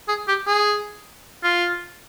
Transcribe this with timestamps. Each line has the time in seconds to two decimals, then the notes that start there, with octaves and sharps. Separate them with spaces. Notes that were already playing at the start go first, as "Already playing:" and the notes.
0.08 G#4
0.28 G4
0.46 G#4
1.43 F4